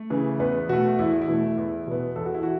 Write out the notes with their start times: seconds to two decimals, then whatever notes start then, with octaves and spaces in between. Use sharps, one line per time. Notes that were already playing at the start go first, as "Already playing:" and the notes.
Already playing: A3
0.10 C#3 E3
0.40 E2 B3 B4
0.69 B2 A3 F#4
0.99 E2 E4
1.22 E4
1.28 B2 A3
1.57 E2
1.87 B2 B3
2.16 E2 A4
2.25 F#4
2.34 E4
2.43 F#4